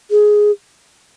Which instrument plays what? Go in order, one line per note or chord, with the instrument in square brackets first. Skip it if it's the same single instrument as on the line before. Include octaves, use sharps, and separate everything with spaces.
[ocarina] G#4